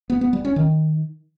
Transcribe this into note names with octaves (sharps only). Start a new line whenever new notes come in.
B3
B3
G3
C#4
D#3